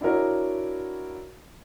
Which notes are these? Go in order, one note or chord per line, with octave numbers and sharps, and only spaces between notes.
D4 E4 F#4 A#4 C#5